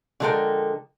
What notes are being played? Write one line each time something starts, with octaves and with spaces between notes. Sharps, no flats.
D3 F3 G#3 A4 A#4 G5